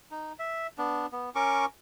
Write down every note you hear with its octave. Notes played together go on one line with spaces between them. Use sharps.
D#4
E5
B3 D4
B3
C#4 A#4 C#6 D6